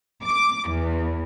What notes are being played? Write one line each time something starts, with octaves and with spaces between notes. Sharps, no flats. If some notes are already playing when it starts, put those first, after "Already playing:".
D6
E2